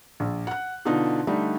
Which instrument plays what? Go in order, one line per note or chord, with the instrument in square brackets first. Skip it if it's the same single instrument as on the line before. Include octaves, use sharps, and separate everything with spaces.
[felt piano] A#1
F#5 F#6
B2 D3 D#4 F4
D3 G3 A3 D#4